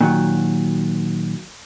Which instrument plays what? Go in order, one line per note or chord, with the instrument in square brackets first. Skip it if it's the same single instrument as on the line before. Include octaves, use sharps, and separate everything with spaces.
[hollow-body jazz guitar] A#2 D#3 F#3